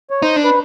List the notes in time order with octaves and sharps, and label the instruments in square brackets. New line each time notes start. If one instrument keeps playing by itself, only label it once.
[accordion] C#5
[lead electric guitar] D#4 [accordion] C5
[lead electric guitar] D4
[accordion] B4